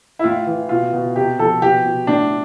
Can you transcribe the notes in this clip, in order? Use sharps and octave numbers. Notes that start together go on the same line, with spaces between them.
E4
A2 F4
E3
B2 F4
B2
C3 G4
F3 A4
B2 G4
B2
A2 D4